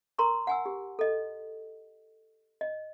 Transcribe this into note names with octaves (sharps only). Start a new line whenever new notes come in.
A#4 A#5 C6 C#6
F#5 G#5 E6
G4
A4 D#5
D#5